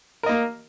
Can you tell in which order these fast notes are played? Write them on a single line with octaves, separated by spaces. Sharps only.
A#4 D#5 A#3